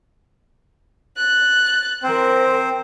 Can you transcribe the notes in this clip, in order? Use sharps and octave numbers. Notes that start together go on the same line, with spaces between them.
F#6 A6
E3 C4 A#4 C5